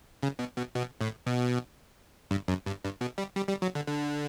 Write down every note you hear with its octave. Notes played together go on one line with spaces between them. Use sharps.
C#3
B2
B2
B2
A2
B2
G2
F#2
G2
G2
B2
G3
G3
G3
F#3
D3
D3